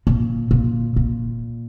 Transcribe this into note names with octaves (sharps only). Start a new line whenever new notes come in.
A#2
A#2
A#2